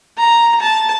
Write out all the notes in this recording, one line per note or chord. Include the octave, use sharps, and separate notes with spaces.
A#5
A5